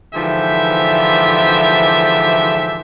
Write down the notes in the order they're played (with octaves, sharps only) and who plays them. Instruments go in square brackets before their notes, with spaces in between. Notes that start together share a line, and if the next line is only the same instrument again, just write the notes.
[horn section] G#2 D3 E3 F3 G4 E5